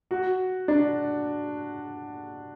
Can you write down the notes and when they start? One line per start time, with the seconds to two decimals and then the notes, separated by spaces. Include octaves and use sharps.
0.11 F#4
0.68 D4